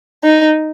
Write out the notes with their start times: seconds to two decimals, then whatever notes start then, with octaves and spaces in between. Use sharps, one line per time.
0.24 D#4